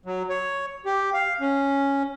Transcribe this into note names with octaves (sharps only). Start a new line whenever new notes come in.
F#3
C#5
G4
F5
C#4